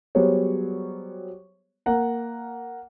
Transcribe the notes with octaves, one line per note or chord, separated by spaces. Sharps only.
F#3 G3 B3 G#4 C5 C#5
A#3 F#5 A#5